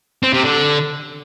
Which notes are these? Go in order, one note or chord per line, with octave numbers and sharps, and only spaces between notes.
C4
C3
D3